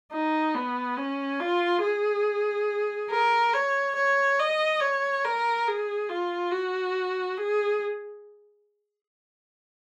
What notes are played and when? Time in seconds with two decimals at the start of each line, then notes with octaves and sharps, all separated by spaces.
0.12 D#4
0.55 B3
0.97 C#4
1.40 F4
1.82 G#4
3.11 A#4
3.54 C#5
3.96 C#5
4.39 D#5
4.81 C#5
5.24 A#4
5.67 G#4
6.09 F4
6.51 F#4
7.37 G#4